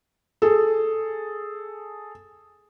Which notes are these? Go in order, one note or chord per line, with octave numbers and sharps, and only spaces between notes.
G#4 A4